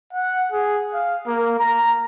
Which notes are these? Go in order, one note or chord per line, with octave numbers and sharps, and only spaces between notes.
F#5
G#4
F5
A#3
A#5